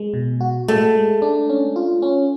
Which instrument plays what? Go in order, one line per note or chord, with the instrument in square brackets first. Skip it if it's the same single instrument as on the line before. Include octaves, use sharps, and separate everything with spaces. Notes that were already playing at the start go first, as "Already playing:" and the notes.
Already playing: [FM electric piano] G#3
B2
F#4
[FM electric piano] G#3 [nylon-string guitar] A3
[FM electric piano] G#3
D4
C#4
F4
C#4